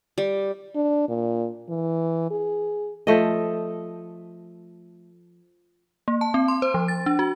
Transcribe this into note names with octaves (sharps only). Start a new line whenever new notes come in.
G3
D4
A#2
E3
G#4
F3 A3 D#5
A#3
A5
C4
C6
C5
F3
A6
D4
F#4